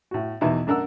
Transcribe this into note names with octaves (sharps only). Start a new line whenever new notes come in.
A2 F#4
E2 B2 D#3 E3 D#4 E4
F#2 D4 A#4 F#5 E6